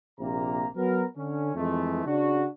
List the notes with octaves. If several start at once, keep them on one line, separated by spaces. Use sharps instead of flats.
A#1 C3 A#3 A#5
F#3 B3 A#4
D3 C#4
F2 E3 G#3 A3
C#3 D4 F#4